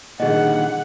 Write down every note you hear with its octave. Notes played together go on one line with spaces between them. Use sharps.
A#2 D3 D#3 G#4 D#5 F#5